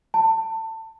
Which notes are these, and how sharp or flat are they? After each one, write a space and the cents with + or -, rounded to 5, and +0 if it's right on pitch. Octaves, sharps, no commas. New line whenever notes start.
A5 +25